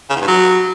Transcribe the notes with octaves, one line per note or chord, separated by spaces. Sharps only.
C#3
E2
G2
F#3